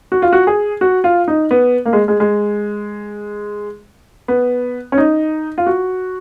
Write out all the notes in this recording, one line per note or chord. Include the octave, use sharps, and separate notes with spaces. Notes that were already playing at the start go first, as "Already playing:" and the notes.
F#4
F4
F#4
G#4
F#4
F4
D#4
B3
A#3
G#3
G#3
G#3
B3
C#4
D#4
F4
F#4